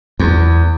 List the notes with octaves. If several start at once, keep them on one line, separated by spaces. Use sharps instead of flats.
E2